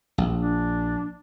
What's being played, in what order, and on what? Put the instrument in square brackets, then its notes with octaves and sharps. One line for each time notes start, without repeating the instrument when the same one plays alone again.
[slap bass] A#1
[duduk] D4